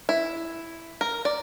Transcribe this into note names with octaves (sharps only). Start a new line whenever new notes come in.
E4
A#4
D5